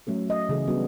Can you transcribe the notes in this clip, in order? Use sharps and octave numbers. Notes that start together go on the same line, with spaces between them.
F#3 A3 C#4 A4
D#5
C#3 E3 G#4 A4
G3 B3 D4 F#4